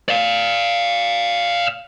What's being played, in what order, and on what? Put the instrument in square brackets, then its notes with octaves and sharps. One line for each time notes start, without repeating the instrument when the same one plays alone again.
[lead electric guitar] D5 F5